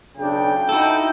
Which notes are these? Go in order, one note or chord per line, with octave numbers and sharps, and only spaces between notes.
B1 C#3 D4 G5
D#4 E4 F#4 A4